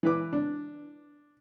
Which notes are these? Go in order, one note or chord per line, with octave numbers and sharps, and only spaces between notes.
E3 B4 D6
D4